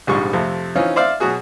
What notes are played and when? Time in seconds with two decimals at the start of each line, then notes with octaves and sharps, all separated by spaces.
0.07 A#1 G#2 C3 G3 C#6
0.33 F2 C3 A3
0.75 E3 C4 C#4 D#4 F4
0.96 C5 D5 E5 F5
1.20 B2 F#3 F#4 G#4